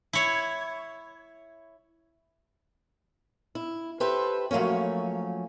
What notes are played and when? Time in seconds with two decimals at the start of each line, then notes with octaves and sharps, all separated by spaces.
0.13 E4 C#5
3.55 E4
4.00 G4 A4 B4 C5 E5
4.51 F3 F#3 A3 A#3 C#4